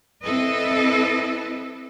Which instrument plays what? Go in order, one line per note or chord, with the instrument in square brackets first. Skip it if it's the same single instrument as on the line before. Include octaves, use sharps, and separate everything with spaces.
[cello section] C4 E4 A4 B4 D#5